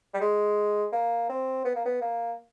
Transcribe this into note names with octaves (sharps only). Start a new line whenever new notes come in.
G3
G#3
A#3
C4
B3
A#3
B3
A#3